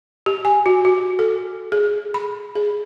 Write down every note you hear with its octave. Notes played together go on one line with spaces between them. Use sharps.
G4
G#5
F#4
F#4
A4
G#4
B5
G#4